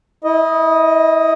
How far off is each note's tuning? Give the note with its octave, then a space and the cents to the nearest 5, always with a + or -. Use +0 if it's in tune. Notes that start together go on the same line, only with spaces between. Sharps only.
E4 -30 D#5 +5